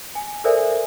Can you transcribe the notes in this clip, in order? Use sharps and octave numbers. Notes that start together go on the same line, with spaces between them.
G#5
A4 A#4 C5 D5 E5 G#5